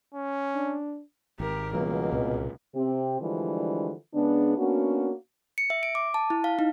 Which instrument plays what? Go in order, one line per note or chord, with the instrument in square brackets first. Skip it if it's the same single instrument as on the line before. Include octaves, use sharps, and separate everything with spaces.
[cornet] C#4
[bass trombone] D4
[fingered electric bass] G#1 [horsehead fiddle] G4 A#4
[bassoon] C#2 [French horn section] B2 [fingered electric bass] E3 G3 [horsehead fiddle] A#3
[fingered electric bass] C2 A#2 C4
[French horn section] C3 C4 G4
D3 E3 F3 G3 G#3 D4
C#3 G#3 B3 D4
A#3 B3 C#4 D4 F#4
[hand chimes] C#7
E5
D7
D6
A5
E4
F5
D#4